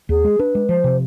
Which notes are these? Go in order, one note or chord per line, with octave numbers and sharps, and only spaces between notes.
D#2 G#4
G#3
D4 B4
G#3
F3 C5
C3